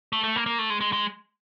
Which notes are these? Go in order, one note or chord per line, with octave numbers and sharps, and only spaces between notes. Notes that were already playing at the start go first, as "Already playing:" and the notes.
A3
A3
A#3
A#3
A3
G#3
G#3
G#3